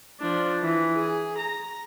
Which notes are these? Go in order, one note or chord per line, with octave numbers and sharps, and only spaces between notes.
F3 D4
E3
G#4
A#5